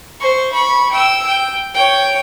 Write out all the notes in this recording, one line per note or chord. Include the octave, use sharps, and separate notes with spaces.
C5 C#6
B5 C#6
G5 E6
G5
C#5 G5